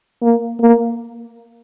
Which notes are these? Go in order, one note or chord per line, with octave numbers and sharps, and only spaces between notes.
A#3
A#3